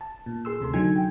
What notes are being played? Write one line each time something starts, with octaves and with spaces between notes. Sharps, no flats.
A5
A#2
G#4 C6 E6
D2 C3 A4 C6
D3 F#3 D#4 G#5 G#6
G5